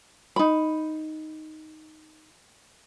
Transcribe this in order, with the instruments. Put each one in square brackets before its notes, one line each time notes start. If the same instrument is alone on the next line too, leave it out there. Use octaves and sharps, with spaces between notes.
[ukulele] D#4 B5